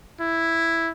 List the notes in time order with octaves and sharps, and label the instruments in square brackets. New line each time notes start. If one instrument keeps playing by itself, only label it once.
[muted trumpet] E4